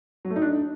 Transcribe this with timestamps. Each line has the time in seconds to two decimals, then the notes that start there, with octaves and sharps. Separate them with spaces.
0.25 F#3
0.30 A3
0.36 D#4
0.42 D4